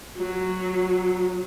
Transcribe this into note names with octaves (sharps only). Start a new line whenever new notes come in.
F#3